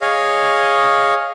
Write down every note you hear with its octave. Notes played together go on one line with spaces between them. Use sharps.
G#4 C#5 D#5 F5